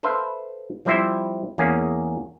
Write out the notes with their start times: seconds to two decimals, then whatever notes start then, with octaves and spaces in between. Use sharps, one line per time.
0.03 A4 B4 C5 E5 F5
0.85 F3 G3 C4 E4 C5 E5
1.58 E2 A#3 C#4 G#4